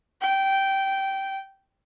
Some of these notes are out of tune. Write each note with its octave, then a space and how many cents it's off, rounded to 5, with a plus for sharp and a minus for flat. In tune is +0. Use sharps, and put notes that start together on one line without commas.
G5 -15